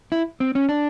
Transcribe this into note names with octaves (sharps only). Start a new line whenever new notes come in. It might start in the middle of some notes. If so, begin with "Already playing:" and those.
E4
C4
C#4
D4